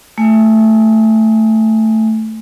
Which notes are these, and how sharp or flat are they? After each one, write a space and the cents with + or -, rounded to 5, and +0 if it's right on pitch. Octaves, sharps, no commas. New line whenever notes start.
A3 +5 G#5 -10